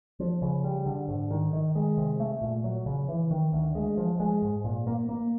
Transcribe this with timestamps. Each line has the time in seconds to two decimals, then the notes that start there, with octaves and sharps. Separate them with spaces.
0.20 F3
0.42 C#3
0.64 G3
0.86 D3
1.08 G#2
1.31 D#3
1.53 D#3
1.75 G#3
1.97 C3
2.20 A3
2.42 A#2
2.64 F#3
2.86 C#3
3.09 E3
3.31 D#3
3.53 D2
3.75 G#3
3.97 F3
4.20 G#3
4.42 G#2
4.64 A#2
4.87 A#3
5.09 A#3